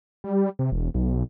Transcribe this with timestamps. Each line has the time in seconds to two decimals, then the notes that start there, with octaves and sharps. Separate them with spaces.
0.24 G3
0.59 C3
0.72 E1
0.94 B1